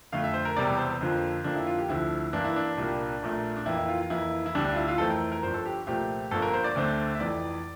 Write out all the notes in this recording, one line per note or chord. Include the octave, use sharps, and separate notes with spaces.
F2 D3 A3 F5
E5
C5
A#4
E1 E2 C3 G3 D5
C5
F2 D3 F3 A#3
F2 D3 F3 A#3 D4
E4
F4
G4
D2 D3 F3 E4
G2 E3 A#3 D4
E4
D4
C2 A#2 G3 A#3
A#1 A#2 A3
D4
F2 E3 A#3 E4
E4
F4
F4
F2 E3 A#3 E4
E4
D2 D3 G3 D4
D4
F4
E4
F4
F2 E3 A3 C4 A4
A#4
A#4
G1 G2 F3 C5
A4
G4
C2 A#2 F3 A3 C4 G4
G1 G2 F3 A#3 A4
A#4
C5
D5
D2 D3 A3 C4
E5
F1 F2 E3 D5